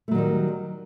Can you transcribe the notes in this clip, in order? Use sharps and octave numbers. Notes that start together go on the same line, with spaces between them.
D#3 F#3 G3 A3